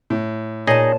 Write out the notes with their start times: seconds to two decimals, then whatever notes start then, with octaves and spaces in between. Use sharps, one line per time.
0.10 A2
0.67 A#2 D#4 G#4 C#5 D#5 A5